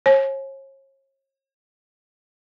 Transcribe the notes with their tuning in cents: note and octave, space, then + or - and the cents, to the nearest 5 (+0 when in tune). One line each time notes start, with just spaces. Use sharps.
C#5 -40 G#5 +40